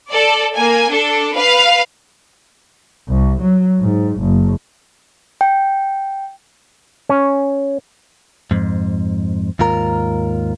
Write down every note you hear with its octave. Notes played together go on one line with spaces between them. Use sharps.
A4 D5
A#3 G#5
D4 A4
B4 F5
C2
F#3
G#2
F#1
G5
C#4
F2 G#2
D#2 G#2 F4 A#4 A#5